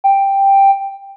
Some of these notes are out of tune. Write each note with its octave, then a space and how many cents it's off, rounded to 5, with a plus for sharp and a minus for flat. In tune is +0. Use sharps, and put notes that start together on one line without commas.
G5 +5